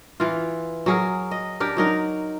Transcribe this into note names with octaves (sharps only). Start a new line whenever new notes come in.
E3 F4
F#3 G#4 A#4
D#5
D4 G4 A#4
F#3 D#4 A#4